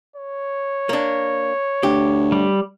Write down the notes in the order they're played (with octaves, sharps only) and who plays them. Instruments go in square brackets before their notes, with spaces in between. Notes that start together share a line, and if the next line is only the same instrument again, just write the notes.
[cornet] C#5
[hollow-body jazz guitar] A#3 D4
[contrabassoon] D2 [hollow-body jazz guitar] G4
[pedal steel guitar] G3